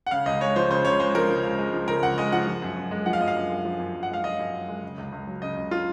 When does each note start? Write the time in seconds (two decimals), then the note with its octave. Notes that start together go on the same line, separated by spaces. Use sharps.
0.07 F#5
0.11 C#3 F5
0.26 C#2 D#5
0.41 G#3 C#5
0.56 F3 C5
0.70 C#3 C5
0.84 C#2 C#5
1.00 G#3 C5
1.15 F3 A#4
1.30 C#3
1.43 C#2
1.58 G#3
1.73 F3
1.88 C#3 A#4
2.03 C#2 F#5
2.18 G#3 D#5
2.32 F3 F#5
2.48 F3
2.62 F#2
2.77 F#2
2.91 G#3
3.06 F3 F#5
3.13 F5
3.21 F#2 D#5
3.28 F5
3.36 F#2
3.50 G#3
3.65 F3
3.80 F#2
3.94 F#2
4.03 F#5
4.09 G#3 F5
4.24 F3 D#5
4.39 F#2
4.53 F#2
4.68 G#3
4.83 C#3
4.98 C#2
5.12 C#2
5.27 F#3
5.42 C#3 D#5
5.57 C#2
5.71 F4